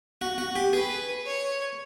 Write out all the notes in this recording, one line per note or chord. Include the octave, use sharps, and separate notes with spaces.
F#4
F#4
G4
G#4 B4
C#5